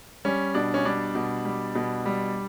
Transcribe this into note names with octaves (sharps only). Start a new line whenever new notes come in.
G3 C#4
B2 D4
C#4
G3 D4
B2
G3
B2
G3